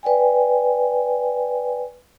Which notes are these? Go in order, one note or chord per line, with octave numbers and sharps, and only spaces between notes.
B4 D5 G5 G#5